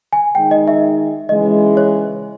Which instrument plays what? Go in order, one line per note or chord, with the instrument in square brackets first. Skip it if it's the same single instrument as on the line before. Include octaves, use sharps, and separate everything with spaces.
[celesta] G#5
[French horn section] D#3 G#3 D#4 [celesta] G5
[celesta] D#5
E5
[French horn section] C#3 E3 G#3 [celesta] D#5
[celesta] C#5